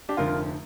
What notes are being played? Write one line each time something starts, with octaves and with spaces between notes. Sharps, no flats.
D4 G4
F1 F2 D3 F3 F4 A#4